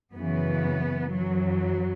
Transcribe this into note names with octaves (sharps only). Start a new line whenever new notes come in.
F#2 C#3 E3 B3
F#2 E3 F#3